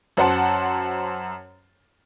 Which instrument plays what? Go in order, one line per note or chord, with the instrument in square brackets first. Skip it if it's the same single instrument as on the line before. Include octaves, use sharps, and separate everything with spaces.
[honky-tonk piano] F#2 C5 F#5 A5